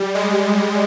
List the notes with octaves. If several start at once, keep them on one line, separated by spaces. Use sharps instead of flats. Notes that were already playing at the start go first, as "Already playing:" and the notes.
Already playing: G3
G#3